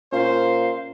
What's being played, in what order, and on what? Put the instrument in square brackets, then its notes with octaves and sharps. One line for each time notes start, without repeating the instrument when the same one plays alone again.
[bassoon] A#2 [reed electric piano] C#4 F4 [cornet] C5 [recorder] F5